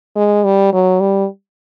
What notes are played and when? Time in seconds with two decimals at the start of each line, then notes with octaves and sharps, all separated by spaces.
0.16 G#3
0.44 G3
0.73 F#3
1.00 G3